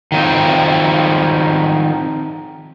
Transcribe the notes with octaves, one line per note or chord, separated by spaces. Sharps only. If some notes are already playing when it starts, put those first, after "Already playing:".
D#3 F3 C4